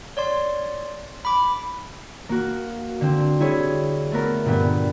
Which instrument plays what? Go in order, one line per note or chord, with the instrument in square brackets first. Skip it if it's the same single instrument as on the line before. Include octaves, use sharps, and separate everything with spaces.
[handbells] C#5 D5 C6
B5 D6
[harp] A#3 F#4
D3 C4
G3 E4 G#4 C#5
A3 B3 A#4
G2 A#2 D3 G3 B3